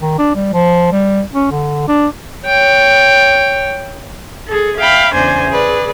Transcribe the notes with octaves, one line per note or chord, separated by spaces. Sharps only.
D#3
D4
G3
F3
G3
C#4
D3
D4
C#5 G5
G#4 A4
E5 F5 G5 B5
E2 C#3 D4 C5 G#5 G#6
G#4 B4 D5